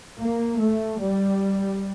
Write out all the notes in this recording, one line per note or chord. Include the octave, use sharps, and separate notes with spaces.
A#3
A3
G3